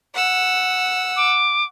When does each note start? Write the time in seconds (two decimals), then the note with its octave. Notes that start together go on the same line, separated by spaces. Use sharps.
0.14 F#5 E6
1.16 D6